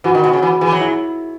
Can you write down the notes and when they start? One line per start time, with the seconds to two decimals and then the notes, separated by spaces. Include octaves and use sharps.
0.04 E3 F#4
0.15 D#3
0.24 B2 F#4
0.33 C#3
0.42 E3 F#4
0.61 E3 G#4
0.72 F#3
0.81 E4